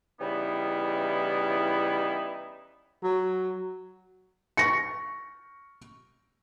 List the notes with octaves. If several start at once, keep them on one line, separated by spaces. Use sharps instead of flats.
C#3 E3 G3 B3 D#4 E4
F#3
C#6 A#6 C#7